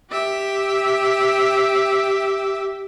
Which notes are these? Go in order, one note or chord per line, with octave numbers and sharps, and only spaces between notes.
G4 E5